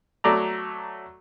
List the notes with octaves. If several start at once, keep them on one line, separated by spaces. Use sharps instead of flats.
F#3 A3 D5 A#5